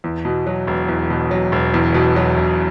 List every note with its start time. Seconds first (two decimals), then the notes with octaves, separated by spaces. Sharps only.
0.04 E2
0.25 B2
0.46 F#3
0.67 E1
0.88 E2
1.10 B2
1.31 F#3
1.52 E1
1.74 E2
1.94 B2
2.16 F#3
2.37 E1